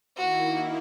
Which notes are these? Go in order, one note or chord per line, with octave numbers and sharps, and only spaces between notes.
D#3 A#3 E4 F#4